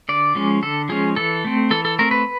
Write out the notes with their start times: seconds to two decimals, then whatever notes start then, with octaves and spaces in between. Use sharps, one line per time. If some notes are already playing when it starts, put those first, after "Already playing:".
0.09 D3 D5
0.35 F3 G#3 C#4
0.63 D3 A4
0.89 F3 G#3 C#4 G#4
1.16 E3 A4
1.45 A3 C4
1.71 E3 A4
1.85 A4
1.99 A3 C4 A#4
2.11 B4